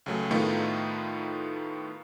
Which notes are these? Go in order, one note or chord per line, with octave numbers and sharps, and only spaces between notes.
C#2 C#3 F#3 A3 G#4
A2 D#3 A3 B3 D#4 F4